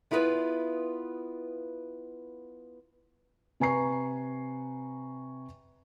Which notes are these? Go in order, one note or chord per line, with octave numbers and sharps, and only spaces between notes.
B3 E4 F4 G#4 A#4 B4
C3 B4 G#5 A#5 C#6 C7